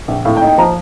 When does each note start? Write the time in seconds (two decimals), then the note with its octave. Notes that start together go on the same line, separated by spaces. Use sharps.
0.08 A#1
0.25 A2 F5
0.37 G5
0.41 D#4
0.47 G5
0.58 F3 A#5